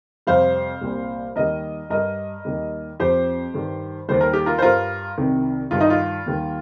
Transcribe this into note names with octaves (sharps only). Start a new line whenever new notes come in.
F2 C3 G3 C5 F5
C2 A#2 G3
D#2 D#3 G3 A#4 D#5
G2 G3 A#4 D#5
D#2 D#3 G3
F2 F3 G4 C5
G2 D#3 G3
D#2 D#3 G3 C5
A#4
G4
F4 A#4
C5
G2 G3 F4 A#4
C2 C3 D#3
G2 D#3 G3 F4
D#4
F4
D#2 D#3 G3